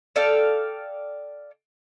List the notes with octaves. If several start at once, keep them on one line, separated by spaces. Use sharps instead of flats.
A4 D5 F5 G5